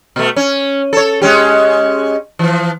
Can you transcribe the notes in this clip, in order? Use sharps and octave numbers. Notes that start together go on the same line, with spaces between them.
B2 A3
C#4
A4 C#5
G#3 C#4 G4
E3 F3